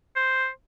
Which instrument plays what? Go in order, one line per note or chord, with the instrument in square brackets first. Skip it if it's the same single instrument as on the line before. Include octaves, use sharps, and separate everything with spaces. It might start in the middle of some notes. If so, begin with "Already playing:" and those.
[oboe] C5